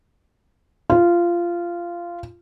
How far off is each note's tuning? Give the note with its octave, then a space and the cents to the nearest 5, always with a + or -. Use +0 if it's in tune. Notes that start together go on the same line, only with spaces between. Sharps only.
F4 -15